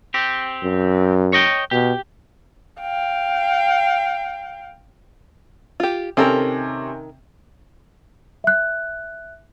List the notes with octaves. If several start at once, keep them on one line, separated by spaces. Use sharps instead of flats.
C4 G4
F#2
C#5 D#5 G5
B2 G4
F5 G5
F4 G4
C3 D#3 C4 C#4 A4 A#4
E5 F#6